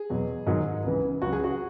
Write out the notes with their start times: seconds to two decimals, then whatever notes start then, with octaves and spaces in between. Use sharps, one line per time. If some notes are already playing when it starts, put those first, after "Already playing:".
Already playing: G#4
0.10 E2 B2 F#3
0.47 G#2 D#3 F#3
0.84 C#2 C#3 E3
1.22 C#2 C#3 F#3 F#4
1.33 G#4
1.44 F#4